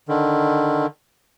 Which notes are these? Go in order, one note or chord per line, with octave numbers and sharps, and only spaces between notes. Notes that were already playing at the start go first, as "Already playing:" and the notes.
D3 D#3